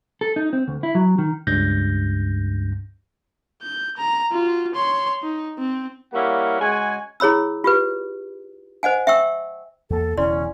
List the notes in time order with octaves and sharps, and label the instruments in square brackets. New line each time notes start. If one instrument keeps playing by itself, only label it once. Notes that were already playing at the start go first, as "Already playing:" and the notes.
[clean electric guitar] A4
D#4
C4
D2
E4
F#3
D#3
[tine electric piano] C#2 G2 G6 A#6
[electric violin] G6
A#5
F4 F#4
C#5 C6
D#4
C4
[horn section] G3 A#3 C#4 E4 A#4 F#5
C#3 G#3 F#4 G#5
[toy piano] E4 G#4 C#5 B5 E6
F4 G4 B4
C5 D#5 F#5 G#5
E5 G5 C#6 E6
[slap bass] E2 A#3 [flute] A4
[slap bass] E1 E2 C#3 [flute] C#4 [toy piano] E4 D5 C6